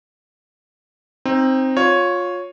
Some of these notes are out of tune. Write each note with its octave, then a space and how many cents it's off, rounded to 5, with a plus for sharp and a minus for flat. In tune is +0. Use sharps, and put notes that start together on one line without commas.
C4 +10 D#4 +0
F4 +25 C#5 +0